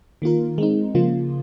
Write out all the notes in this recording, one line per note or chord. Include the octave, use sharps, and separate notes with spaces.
D#3 A#3 F4 A#4
G#3 C4 D#4
C#3 F3 A#3 F4